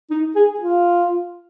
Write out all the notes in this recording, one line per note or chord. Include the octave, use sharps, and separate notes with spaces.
D#4
G#4
F4